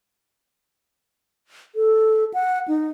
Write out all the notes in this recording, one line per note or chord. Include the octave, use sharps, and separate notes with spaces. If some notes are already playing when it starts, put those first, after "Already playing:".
A4
F#5
D#4